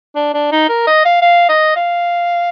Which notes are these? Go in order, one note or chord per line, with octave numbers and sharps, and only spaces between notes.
D4
D4
D#4
A#4
D#5
F5
F5
D#5
F5